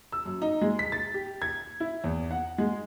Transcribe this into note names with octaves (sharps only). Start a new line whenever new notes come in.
E6
F#2
D#4
G#3
B6
A6
G4
G#6
E4
E2
F#5
G#3